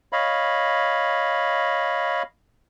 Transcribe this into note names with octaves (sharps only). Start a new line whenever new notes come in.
C#5 D#5 F5 B5